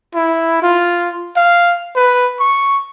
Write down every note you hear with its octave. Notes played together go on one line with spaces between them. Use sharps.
E4
F4
F5
B4
C#6